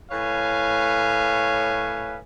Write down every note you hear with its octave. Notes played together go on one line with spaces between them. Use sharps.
A2 B4 C#5 F5 G#5